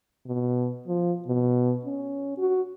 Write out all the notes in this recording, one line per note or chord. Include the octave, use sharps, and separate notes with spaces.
B2
F3
B2
C#4
F#4